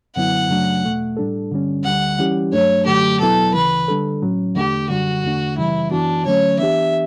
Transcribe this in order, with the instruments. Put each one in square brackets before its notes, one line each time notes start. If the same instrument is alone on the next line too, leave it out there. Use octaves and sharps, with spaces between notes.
[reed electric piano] F#2 D3 F#3 B3 E4 [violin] F#5
[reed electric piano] F#2 C#3 F#3 A3 D4
E2 B2 A3
A2 G3 D4 A4
G2 D3 G3 C#4
[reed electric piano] D2 D3 G3 [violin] F#5
[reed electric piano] E3 G3 C#4 E4 G4
[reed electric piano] G2 F#3 A3 D4 [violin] C#5
[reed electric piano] F#2 D3 F#3 A3 [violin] G4
[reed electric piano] E2 B2 F#3 B3 E4 [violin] A4
[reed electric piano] D2 C#3 E3 [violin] B4
[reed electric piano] D3 G3 D4 A4
A2 F#3 C#4
[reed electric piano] E2 D3 A3 D4 [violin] G4
[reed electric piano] F#2 D3 G3 [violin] F#4
[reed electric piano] E2 D3 A3 D4
[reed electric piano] F#2 C#3 E3 G3 [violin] E4
[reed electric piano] F#2 E3 B3 F#4 [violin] D4
[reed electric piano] D3 F#3 A3 C#4 [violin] C#5
[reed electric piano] E3 B3 D4 G4 [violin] E5